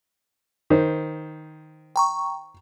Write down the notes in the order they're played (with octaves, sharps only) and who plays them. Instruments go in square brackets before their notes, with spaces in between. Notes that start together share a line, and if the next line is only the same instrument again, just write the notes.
[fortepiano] D#3 C5
[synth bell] G5 A#5 C#6